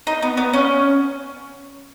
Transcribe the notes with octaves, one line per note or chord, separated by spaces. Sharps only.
D#4
B3
B3
C#4